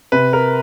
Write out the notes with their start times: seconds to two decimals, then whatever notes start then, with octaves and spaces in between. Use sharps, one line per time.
0.12 C3 B4
0.33 A#4